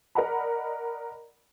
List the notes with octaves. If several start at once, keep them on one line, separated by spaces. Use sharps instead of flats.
A#4 D5 D#5 F#5 A#5 B5